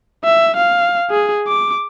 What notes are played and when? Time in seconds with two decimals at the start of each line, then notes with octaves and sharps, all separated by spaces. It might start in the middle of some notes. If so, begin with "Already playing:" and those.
0.24 E5
0.56 F5
1.10 G#4
1.47 D6